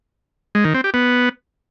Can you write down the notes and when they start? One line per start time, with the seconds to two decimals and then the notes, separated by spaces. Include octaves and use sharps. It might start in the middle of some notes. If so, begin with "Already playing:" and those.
0.55 G#3
0.65 D#3
0.74 C4
0.84 G4
0.94 B3